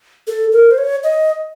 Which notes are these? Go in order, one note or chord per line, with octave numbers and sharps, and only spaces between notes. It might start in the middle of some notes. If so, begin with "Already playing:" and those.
A4
A#4
C5
C#5
D#5